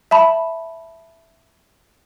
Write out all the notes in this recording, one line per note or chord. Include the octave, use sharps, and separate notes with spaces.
E5 A5 B5